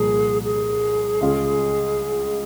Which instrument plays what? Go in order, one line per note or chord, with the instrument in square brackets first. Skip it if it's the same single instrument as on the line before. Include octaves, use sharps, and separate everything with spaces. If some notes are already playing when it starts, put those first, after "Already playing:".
Already playing: [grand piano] C2 A#2 F3 A#3 [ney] G#4
[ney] G#4
[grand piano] C#2 C#3 G#3 C#4 F4